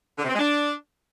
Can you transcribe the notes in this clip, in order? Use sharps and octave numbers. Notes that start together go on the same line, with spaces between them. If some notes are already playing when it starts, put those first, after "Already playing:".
D3
C3
C4
G#3
D4